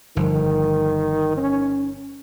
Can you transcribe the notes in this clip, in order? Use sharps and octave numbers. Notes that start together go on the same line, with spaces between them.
G1 D#3 F3
C#4